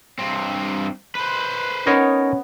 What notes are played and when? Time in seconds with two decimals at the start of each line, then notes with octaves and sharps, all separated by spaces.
0.19 G2 C4
1.15 B4 C5
1.87 B3 C#4 D#4 A#4 C#5